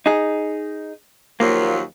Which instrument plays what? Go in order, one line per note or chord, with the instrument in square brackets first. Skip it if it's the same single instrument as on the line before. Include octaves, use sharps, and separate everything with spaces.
[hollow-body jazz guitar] D#4 G#4
[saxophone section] D#2 F3 F#3 [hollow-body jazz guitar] A#3